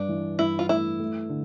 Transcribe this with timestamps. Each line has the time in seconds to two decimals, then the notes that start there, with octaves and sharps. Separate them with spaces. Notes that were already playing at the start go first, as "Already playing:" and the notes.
Already playing: G2 D4
0.09 E3
0.39 G2 E4
0.59 F4
0.69 A3 E4
0.99 A3
1.29 D3